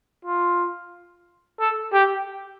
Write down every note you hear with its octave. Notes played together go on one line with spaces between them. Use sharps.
F4
A4
G4